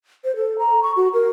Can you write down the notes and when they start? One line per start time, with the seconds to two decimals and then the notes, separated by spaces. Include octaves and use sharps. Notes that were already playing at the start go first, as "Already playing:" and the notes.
0.25 C5
0.36 A4
0.59 A#5
0.83 C#6
0.96 F#4
1.13 A#4